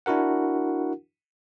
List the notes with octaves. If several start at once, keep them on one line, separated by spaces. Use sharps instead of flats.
D4 E4 F#4 A#4 F#5